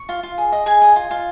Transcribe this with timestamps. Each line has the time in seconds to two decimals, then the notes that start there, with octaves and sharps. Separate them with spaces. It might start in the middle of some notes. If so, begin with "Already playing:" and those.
Already playing: C#6
0.09 F4
0.23 F4
0.38 G#4
0.52 D#5
0.66 G#4 G#5
0.82 D#5
0.96 F4
1.11 F4